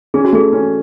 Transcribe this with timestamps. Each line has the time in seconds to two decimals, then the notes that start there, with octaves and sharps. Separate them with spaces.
0.14 C#4 G#4
0.25 F#4
0.33 A3 G#4
0.53 C#4